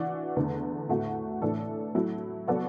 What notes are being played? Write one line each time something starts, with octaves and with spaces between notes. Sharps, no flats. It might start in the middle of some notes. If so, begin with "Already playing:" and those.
Already playing: E3 D4 F#4 D5
E2 D3 A3
A2 A3 F#4
A2 E3 D4 A4
F#3 A3 E4
F#3 B3 F#4 A4 D5